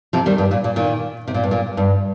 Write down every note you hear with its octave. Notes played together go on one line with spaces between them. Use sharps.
C3 F3
D#3 G3
G2
A#2
A#2
A#2 D#3
C3
A#2
G2
A#2
G2